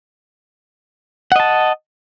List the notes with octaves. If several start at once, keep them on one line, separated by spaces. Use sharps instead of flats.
D#5 F#5 A5